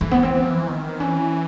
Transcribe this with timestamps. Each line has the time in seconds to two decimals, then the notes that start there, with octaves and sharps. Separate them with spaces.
0.01 E3 A3
0.11 B3
0.23 C4
0.35 E3
0.43 F3
0.50 E3
0.68 D#3
1.00 E3 C#4